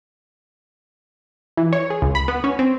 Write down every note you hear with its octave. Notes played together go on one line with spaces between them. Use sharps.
E3
C#5
G#4
C#2
B5
B3
C#4
C4